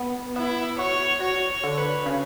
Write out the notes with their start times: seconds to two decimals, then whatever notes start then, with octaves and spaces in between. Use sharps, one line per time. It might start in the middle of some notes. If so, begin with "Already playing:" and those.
Already playing: B3
0.36 B3 E4
0.79 F#4 C#5
1.21 F#4 C#5
1.49 C#5
1.64 D3
1.78 B4
2.06 C#3